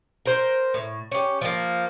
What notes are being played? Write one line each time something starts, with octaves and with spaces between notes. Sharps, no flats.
A#4 C5
A2
C#4 G4
F3 A#3